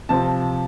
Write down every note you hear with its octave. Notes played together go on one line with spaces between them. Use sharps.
C3 F3 C4 A5